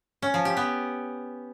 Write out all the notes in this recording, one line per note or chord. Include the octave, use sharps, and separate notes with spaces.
C#4
F3
G4
B3